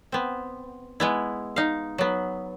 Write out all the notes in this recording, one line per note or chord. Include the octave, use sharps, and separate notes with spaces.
B3 C4
G#3 B3 E4
D#4 F5
F#3 B3